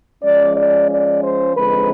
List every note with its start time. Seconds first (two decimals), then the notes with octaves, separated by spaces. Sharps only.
0.23 F3 G#3 C#4 D5
0.56 D5
0.90 D5
1.23 C5
1.56 D3 F3 G#3 C4 D#4 B4